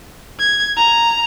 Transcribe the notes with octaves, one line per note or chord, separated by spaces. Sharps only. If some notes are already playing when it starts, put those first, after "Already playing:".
G#6
A#5